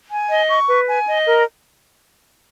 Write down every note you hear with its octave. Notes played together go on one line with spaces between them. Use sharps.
G#5
D#5
C#6
B4
G#5
D#5
A#4